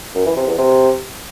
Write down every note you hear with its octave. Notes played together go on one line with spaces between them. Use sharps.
F#2
E3
C3
E2
C3